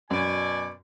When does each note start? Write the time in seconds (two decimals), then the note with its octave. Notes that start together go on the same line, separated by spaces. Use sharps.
0.11 F#2 B2 D5 G#5